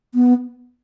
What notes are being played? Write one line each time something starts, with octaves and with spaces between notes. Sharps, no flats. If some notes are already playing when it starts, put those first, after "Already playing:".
B3